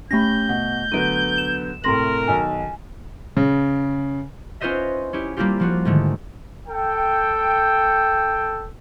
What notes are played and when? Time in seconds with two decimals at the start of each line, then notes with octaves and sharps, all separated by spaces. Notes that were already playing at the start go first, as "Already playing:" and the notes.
0.11 A3 C#4 G4 B5 G6 A#6
0.49 B2 F#5
0.92 D3 F#3 B3 D7 D#7
1.38 E7
1.84 A2 C3 A3 A#4 C6 A#6 F#7
2.28 B1 D#3 G#5
3.37 C#3
4.61 C#4 F4 B4 C5 D#5 E5
5.13 C#4 E4 G4
5.37 G3 A#3 C4 E4 F4 G4
5.60 F3 F4 F#4
5.85 G#2 D3 D#3 G#3 A3
6.67 A4 G5